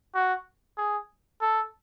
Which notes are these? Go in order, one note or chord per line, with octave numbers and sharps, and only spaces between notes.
F#4
G#4
A4